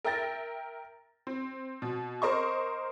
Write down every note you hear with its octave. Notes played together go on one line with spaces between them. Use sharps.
A#4 E5 G5 A6 A#6
C4
B2
A#4 C5 D#5 C#6